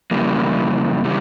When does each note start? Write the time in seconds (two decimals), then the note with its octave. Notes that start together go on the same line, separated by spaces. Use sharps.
0.11 F2 C#3 E3 G3 A#3
1.05 C#3 E3 G3